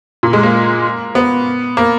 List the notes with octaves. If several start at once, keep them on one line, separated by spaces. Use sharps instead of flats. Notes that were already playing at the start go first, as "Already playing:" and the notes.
A#2
G#3
A#3
B3
A#3